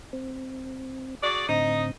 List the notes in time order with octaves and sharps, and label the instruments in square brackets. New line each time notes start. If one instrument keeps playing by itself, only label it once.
[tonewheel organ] C4
[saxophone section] F#4 G#4 D5
[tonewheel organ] A2 D3 C4 [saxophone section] D#4 D#5